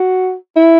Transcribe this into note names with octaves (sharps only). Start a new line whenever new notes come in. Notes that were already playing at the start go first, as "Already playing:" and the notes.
Already playing: F#4
E4